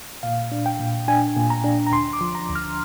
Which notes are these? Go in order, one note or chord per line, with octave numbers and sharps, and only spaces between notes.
A#2 F5
D4
G5
A#2
D4 G#5
A#2
A#5
D4
A#5
D2 C6
D6
F3
A#5
D2
F6